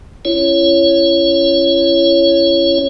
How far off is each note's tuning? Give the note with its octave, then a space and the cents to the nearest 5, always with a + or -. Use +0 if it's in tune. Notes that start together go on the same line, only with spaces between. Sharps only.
C#4 +0 E4 +40 C#5 +0